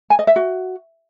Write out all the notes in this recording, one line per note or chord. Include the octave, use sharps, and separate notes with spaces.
G#5
D#5
E5
F#4